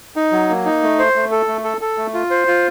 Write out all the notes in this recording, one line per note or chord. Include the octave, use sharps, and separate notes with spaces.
D#4
F#3
A#3
D#4
A3
C5
A3
A4
A3
A4
A4
A3
F4
C5
F4